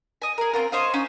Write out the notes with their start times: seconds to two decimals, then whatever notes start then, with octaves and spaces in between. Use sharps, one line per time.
0.22 D#5 G#5
0.38 G#4 A#4
0.53 C4 C#4 F4 A#4
0.72 C5 C#5 D#5 F5
0.94 C#4 D#4